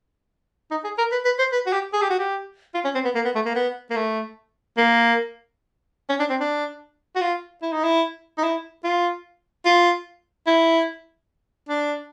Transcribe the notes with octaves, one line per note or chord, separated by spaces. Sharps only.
D#4
G#4
A#4
B4
B4
C5
B4
F#4
G4
G#4
G4
F#4
G4
F4
C#4
C4
B3
A#3
B3
A3
A#3
B3
A#3
A3
A#3
C#4
D4
C4
D4
F#4
F4
E4
D#4
E4
D#4
E4
F4
F4
E4
D4